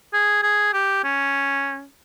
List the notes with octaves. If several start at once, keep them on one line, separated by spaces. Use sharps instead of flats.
G#4
G#4
G4
C#4